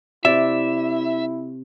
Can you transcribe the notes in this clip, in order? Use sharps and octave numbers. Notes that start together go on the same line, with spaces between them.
C3 E4 D5 E5